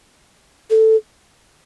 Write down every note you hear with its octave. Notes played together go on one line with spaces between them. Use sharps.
A4